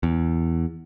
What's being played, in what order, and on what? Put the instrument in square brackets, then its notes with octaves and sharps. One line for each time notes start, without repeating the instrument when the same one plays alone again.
[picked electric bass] E2